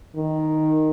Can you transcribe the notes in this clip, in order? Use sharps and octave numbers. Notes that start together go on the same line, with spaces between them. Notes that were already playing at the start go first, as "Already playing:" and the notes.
D#3